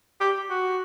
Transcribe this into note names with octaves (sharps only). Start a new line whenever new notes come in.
G4
F#4